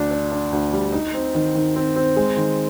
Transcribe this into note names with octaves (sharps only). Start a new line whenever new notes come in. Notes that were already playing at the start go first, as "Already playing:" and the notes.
Already playing: D2 D4
D4
D4
D2
G3
D#4
C4
D#3
D#3
C4
C4
G#3
D#3